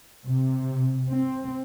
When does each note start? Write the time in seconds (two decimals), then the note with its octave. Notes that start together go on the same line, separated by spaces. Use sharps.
0.24 C3
1.12 C4